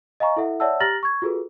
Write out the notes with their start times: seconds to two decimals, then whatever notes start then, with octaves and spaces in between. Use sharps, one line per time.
0.20 D#5 F5 G#5 A#5 C#6
0.36 E4 A4 E5 F#5
0.60 C#5 D5 E5 F#5 A5 E6
0.81 G4 A#5 F6 A6 A#6 F#7
1.03 C#6 G#6
1.22 F4 F#4 G#4 A4 B4